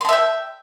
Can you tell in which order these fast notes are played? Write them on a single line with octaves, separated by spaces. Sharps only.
C6 A5 E5 G5